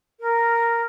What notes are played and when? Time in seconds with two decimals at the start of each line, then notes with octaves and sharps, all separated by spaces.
0.20 A#4